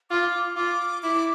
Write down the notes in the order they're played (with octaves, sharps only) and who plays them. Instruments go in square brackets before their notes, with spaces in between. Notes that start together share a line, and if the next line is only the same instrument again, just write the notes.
[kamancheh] F4 [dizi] D6
[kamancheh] F4 [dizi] D6
[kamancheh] E4 [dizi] D6